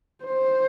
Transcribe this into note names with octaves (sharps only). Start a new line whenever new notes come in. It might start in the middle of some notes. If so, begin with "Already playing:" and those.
C5